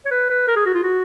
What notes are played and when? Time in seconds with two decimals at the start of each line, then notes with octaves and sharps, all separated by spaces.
0.05 C#5
0.11 B4
0.30 B4
0.48 A#4
0.56 G#4
0.66 F#4
0.74 F4
0.83 F#4